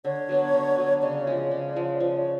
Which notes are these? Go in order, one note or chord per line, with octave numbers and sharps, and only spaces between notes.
D3 C#5
F#3 B3 D4
D3
F#3 B3 D4
C#3 D5
F3 G#3
C#3
F3 G#3
F3 D5
C#5